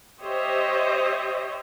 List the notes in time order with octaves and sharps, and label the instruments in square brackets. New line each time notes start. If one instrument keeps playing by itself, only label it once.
[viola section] G4 C5 C#5 D#5 E5